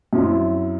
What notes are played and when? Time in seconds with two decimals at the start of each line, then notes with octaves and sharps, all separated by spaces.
0.13 F#2 F#3 C4 E4